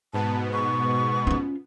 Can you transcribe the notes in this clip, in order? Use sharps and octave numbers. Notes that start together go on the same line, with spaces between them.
G#2 B2 B3 A5
C#6
C#4 F4